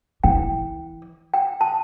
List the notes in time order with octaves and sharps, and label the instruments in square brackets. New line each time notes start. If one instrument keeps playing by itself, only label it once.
[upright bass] E3 [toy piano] G5
[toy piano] G5
A5